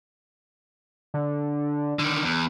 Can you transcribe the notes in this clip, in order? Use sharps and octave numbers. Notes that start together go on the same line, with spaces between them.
D3
D3 D#3
E2